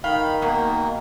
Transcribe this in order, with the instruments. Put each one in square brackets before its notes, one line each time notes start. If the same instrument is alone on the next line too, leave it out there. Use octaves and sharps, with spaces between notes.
[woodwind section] D#3 [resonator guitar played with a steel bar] F5 [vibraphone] G5 [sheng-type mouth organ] B5
[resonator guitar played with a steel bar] B2 [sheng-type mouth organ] A#3